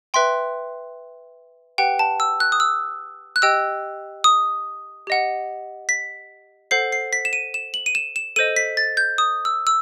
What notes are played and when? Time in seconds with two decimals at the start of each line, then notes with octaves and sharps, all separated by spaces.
0.14 B4 E5 G5 C6
1.78 G4 B4 F#5 G5
1.99 A5
2.20 E6
2.40 F#6
2.52 D#6
2.60 E6
3.36 F#6
3.42 G4 D#5 G5 E6
4.24 D#6
5.07 G4 D#5 F#5
5.89 B6
6.71 A4 C5 F#5 C7
6.92 C7
7.13 B6
7.25 E7
7.33 D#7
7.54 E7
7.74 F#7
7.86 D#7
7.95 E7
8.16 E7
8.36 A4 C5 D#5 D#7
8.56 B6
8.77 A6
8.97 G6
9.18 D#6
9.45 E6
9.67 E6